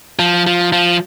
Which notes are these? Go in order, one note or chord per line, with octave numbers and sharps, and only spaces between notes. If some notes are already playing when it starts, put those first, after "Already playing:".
F3
F3
F3